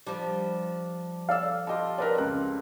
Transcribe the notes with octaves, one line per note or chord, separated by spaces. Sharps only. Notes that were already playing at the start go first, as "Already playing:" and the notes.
F3 G3 D4
A4 D5 F5 E6
F4 G4 A4 D#5 A5
C4 A#4 B4 D5
C#2 F#6